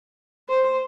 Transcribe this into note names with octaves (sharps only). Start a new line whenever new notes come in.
C5